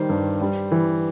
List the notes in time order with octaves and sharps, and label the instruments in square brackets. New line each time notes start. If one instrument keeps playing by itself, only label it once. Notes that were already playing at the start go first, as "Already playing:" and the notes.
Already playing: [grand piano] D#3 G3 C5
G2
G3
E3